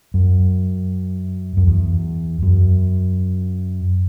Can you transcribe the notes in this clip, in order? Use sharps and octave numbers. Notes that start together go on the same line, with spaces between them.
F#2
F#2
E2
F#2